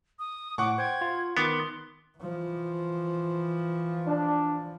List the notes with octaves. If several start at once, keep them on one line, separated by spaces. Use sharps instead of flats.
D#6
A2 F#5 C#6 D6
C5 G5 G#6
F4
D#3 B3 C6 D6
E3 F3
D4